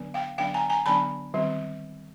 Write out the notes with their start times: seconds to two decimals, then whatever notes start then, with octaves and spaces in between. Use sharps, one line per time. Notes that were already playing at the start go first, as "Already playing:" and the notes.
Already playing: D3 F#3 B3 D4
0.14 F5 G5
0.38 D3 F#3 B3 D4 F5 G5
0.54 G#5 A#5
0.70 G#5 A#5
0.86 D3 F#3 B3 D4 A5 B5
1.34 D#3 G3 C4